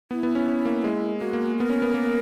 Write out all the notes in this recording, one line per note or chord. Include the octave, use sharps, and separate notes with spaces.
B3 E4
B3
C#4
C#4
A#3
G#3
A#3 F#4
A#3
B3 A#4
C#4
B3
A#3